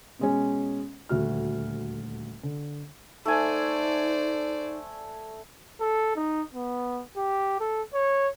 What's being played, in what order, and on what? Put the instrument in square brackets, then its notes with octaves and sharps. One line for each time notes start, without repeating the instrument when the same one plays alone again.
[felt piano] B2 G#3 C#4
D#1 D2 F#4 F6
D3
[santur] A3 G#5 [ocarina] D#4 [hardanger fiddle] C5 D5
[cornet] A4
D#4
B3
G4
A4
C#5